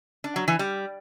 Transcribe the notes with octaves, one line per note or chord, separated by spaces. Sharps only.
D4
F#3
E3
G3